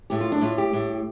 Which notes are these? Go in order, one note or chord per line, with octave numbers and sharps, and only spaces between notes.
A2 G4
F4
D4
A2 F4
G4
A2